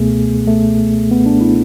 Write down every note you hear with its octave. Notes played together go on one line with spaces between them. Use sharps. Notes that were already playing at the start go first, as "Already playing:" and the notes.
Already playing: C#2 B2 A3 B3 G#4
A3
B3
D4
E4